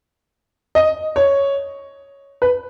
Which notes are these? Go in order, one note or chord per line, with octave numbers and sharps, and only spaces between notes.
D#5
C#5
B4